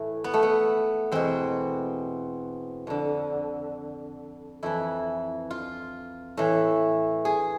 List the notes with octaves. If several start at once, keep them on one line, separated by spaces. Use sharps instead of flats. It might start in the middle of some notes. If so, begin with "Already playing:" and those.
Already playing: A2 E3 A3
B3
A3
B3
E2 B2 C4
F2 D3
F2 E3 E4
F4
A2 E3
G#4